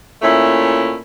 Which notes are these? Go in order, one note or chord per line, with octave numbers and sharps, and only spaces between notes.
A#2 A3 C#4 E4